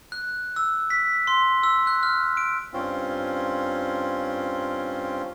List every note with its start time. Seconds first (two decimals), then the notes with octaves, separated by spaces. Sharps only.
0.12 F#6
0.56 E6
0.90 B6
1.27 C6
1.63 E6
1.87 F#6
2.03 F6
2.37 D7
2.74 G2 C4 C#4 F4